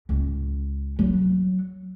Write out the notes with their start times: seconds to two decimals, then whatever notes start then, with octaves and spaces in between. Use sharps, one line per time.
0.09 C#2
0.99 F#3